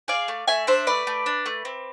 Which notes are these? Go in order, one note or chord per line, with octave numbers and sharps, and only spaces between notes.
G#4 D5 F5
A3
A3 E5 G#5
D4 C5 E5
A3 B4 D5
A3
D4
A3
C4